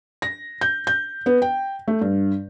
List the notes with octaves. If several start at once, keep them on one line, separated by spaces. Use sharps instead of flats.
A#6
G6
G6
B3
G5
A3
G2